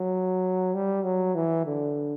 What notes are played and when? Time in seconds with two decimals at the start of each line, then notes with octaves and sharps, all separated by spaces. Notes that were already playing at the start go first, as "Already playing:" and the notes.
Already playing: F#3
0.74 G3
1.04 F#3
1.35 E3
1.66 D3